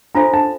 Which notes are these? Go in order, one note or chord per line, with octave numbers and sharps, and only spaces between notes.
D4 F4 A4 C5 F5 A#5
A5